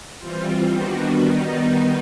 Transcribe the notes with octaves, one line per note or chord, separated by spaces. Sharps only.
E3 G3 C4 F4
D#3 G3 B3 D4 F#4
D#3 G3 B3 D#4